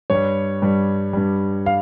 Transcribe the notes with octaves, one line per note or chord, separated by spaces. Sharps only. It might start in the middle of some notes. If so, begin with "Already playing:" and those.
G2 G3 C#5
G2 G3
G2 G3
F5